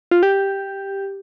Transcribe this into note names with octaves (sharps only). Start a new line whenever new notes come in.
F4
G4